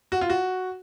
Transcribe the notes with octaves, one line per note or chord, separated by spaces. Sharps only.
F#4
F4
F#4